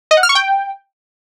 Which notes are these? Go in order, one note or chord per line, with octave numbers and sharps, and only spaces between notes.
D#5
F#5
F6
C#6
G5